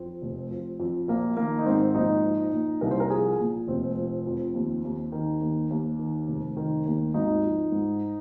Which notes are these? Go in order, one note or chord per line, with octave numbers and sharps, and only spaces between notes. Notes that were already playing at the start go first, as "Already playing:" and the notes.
Already playing: F2 C4
F1
F3
F2
A#1 A#3
D#3 A#3
D#4
G#2 C4
A#1 D#4
F3
A#2
C2 A#4
C5
A#4
F3 G#4
A#2
F1 C4
F3
F2
D#2
D#2
D#3
D#2
D#2
D#3
F1
D#3
D#2
G#1 D#4
F3
G#2